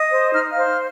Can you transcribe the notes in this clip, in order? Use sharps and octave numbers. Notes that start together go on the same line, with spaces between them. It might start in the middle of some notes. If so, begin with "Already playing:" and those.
Already playing: D#5 D#6
C5
D#4 F6
D#6
F5 F6
C5